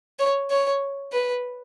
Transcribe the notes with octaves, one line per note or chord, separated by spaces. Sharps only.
C#5
C#5
B4